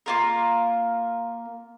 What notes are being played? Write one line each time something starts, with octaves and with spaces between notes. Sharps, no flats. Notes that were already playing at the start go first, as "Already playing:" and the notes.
A#3 F4 A#4